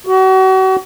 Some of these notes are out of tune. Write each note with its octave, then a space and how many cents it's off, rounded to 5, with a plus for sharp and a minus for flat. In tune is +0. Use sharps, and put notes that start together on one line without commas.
F#4 +35